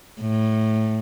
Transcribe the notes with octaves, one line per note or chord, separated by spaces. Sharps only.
A2